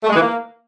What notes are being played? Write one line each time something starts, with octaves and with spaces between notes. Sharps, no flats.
A3
G#3
E3
A#3